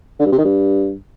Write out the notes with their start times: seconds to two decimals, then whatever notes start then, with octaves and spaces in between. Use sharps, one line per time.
0.20 D3
0.26 G2
0.32 C3
0.38 D#3
0.45 G2